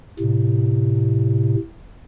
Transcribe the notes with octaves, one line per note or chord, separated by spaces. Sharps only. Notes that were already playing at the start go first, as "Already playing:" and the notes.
A2 C3